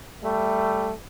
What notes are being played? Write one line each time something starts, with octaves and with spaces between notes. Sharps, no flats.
G3 A3